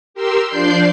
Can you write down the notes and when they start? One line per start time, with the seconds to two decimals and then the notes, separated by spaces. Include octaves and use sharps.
0.14 G4 A#4 C6 E6
0.47 F3 D4 D5 C6 G6 C7